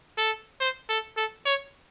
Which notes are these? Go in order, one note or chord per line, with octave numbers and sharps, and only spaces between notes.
A4
C5
A4
A4
C#5